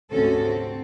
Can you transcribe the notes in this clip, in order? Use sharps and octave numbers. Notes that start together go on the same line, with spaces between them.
D2 G#2 C3 C#4 F#4 A4
C4